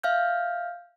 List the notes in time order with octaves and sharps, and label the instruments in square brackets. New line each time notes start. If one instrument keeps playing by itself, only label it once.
[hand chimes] E5 F5 F6 G6